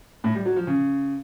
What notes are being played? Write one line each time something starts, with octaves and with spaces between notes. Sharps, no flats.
A2
G3
F#3
F3
C#3